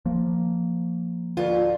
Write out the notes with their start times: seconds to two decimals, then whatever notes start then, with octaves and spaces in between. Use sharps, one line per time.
0.06 F3 A#3
1.37 D2 F4